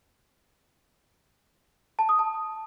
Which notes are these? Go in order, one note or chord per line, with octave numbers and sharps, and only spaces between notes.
A5
D#6
A5